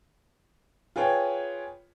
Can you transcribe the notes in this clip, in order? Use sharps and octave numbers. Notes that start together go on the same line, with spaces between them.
F4 G#4 B4 C#5 G5